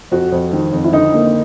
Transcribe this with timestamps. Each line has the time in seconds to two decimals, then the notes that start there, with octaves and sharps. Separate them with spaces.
0.11 F2 F#4
0.32 F2
0.53 D#3
0.73 F2
0.84 E4
0.92 D3 D#4
1.14 A#3